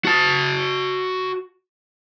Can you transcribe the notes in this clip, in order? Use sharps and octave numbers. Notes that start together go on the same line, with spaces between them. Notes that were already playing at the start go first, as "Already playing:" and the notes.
F#4 A5